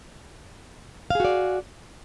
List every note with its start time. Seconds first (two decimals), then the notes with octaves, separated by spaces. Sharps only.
1.10 F5
1.15 G#4
1.20 F#4
1.25 D5